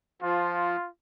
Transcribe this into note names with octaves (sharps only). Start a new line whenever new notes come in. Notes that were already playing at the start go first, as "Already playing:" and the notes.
F3 F4